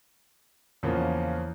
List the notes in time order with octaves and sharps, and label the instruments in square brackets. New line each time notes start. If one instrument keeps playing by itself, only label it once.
[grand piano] E2 C#3 F3 A#3 C#4